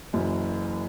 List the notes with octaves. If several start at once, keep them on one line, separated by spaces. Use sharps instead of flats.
F#1 F#2 E3